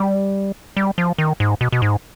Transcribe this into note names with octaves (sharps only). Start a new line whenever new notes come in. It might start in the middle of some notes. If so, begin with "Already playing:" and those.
Already playing: G3
G3
F3
D#3
G#2
B2
B2
G#2